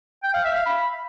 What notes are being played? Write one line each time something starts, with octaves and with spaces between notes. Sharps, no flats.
G5
F5
E5
F5
B5